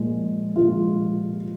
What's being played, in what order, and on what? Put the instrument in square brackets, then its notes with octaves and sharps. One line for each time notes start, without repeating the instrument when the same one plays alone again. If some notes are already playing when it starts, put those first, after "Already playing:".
Already playing: [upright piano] A#2 F3 G#3
A#2 F3 G#3 F4